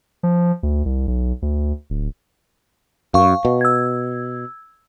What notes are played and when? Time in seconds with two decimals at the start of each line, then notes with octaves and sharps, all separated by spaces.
0.23 F3
0.63 D2
0.85 C2
1.07 B1
1.42 D2
1.90 D1
3.14 F#2 F5 C#6
3.45 B2
3.61 E6 G#6